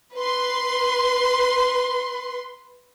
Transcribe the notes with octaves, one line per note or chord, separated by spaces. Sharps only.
B4 C6